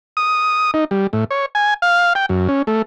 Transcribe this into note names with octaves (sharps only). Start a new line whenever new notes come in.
D#6
D#4
G3
A2
C#5
G#5
F5
G5
F#2
C#4
A3